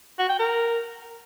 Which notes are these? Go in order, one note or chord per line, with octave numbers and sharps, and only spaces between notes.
F#4
G5
A#4